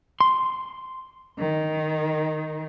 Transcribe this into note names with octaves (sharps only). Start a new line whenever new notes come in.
C6
D#3